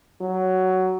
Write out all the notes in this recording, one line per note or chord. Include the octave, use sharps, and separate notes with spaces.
F#3